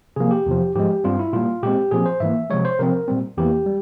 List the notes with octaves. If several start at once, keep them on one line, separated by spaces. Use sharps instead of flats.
C3 F3 A#3 G#4
G4
E2 C3 F3
G#2 F3 G#3 G4
G2 G3 C4 F4
E4
A#2 G3 A#3 F4
A#2 G#3 C4 G4
A#2 F3 C4 G#4
C5
G#2 E3 A#3 E5
C3 F3 G#3 C#5
C5
C3 F3 C4 A#4
A#2 G3 C4
E2 E3 A#3 G4
G3